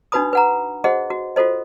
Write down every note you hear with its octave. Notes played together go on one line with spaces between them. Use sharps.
D4 D#4 F#4 B4 B5 D#6
B4 F#5 A#5
F#4 G#4 C5 D#5 F#5
F#4
F4 F#4 A4 C5 D#5